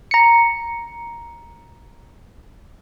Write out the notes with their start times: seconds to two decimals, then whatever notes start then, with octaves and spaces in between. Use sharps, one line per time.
0.11 A#5 C#7